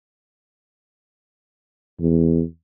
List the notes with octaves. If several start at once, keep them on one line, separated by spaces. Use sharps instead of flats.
E2